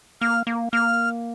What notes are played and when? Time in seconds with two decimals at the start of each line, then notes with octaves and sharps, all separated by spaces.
0.21 A#3 F6
0.47 A#3
0.73 A#3 F6